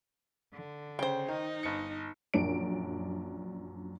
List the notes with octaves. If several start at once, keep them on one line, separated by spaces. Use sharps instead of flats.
D3
C#3 C5 G5
D#3 D#4
G1 C#7
A#1 F#2 D4 D7